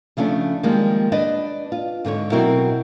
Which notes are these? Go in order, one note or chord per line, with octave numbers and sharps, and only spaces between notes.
C#3 F3 A3 C#4 D4
D#3 F3 G3 G#3 A#3
D4 B4 D5 D#5
F4
G#2 D3 A#4 C#5
B2 F#3 C4 E4 F#4 A#4